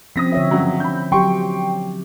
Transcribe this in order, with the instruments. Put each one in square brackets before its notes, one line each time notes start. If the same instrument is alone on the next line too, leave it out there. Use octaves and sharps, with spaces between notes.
[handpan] F3 C4 C#4 [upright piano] D#6 A#6 B6
[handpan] D3 C#5 E5
[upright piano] G2 C#3 F#3
B5 G6
[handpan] F#3 G4 [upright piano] G5 C6 C#6